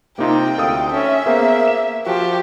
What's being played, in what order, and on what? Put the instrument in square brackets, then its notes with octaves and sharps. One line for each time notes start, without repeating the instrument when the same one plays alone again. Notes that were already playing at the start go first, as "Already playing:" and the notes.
[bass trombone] C3 [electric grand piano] A#3 D#4 F4 [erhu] G5
[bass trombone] D2 [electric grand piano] A4 F5 D#6
[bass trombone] C#4 [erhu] E5
[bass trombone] A#3 [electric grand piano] B3 G#4 C5
[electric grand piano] E7
[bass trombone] F3 [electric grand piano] F#4 [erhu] G4